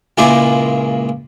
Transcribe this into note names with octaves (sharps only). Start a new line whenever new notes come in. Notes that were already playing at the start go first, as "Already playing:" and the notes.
C#2 A#2 E4 G#4 D6